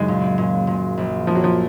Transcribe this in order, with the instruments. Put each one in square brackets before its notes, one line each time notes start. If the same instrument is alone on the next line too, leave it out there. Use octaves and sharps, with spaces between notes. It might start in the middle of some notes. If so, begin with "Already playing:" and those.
Already playing: [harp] F#1 F#2 D#3 [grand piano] G#3
[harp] A#2
A#2
A#2
A#1
[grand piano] F3 [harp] A#3
[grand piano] F#3
F3